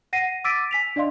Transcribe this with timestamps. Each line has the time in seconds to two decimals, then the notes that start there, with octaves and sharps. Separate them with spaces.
0.13 F#5 A#6 C7 D#7
0.44 D6 E6 A6 B6 D7 D#7
0.71 G#5 B6 F7
0.96 D4 D5 D#5 F5 C6